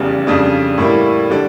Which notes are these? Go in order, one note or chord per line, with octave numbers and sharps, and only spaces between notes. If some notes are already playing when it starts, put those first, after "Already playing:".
Already playing: F1 E2 C#3 G3
F2 C#3 G3 D4
A2 G3 A#3 E4
D3 G3 D4